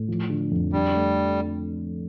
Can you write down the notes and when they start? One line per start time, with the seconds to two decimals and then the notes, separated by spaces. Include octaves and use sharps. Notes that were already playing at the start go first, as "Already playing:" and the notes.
Already playing: A2
0.08 F3
0.30 D3
0.51 F2
0.73 G3 D4
0.95 A3